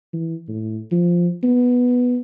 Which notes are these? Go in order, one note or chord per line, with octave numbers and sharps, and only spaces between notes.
E3
A2
F3
B3